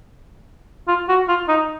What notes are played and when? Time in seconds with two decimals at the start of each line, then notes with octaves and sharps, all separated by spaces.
0.88 F4
1.08 F#4
1.28 F4
1.48 D#4